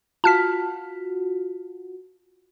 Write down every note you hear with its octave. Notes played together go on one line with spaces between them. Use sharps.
F4 F#4 A5 F6 B6